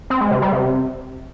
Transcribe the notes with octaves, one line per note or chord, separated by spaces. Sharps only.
C4
G#3
C3
G3
C3